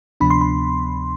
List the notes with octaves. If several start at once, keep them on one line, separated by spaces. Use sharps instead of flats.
D2 C3 F3 B3 D4 B5
C6
B5